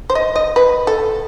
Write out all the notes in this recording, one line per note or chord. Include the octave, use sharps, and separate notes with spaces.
C5
D#5
D#5
B4
A4